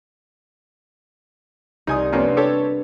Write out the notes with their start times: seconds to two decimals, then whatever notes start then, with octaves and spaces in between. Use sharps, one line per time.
1.87 C2 D#4 G#5 D#6
2.12 F2 A#3 B3 C#4 D4
2.37 G4 A4 C#5